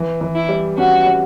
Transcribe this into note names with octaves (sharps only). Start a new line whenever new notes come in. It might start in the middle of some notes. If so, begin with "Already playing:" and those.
Already playing: E3
E3
E4
G3
C#4 F#4
G3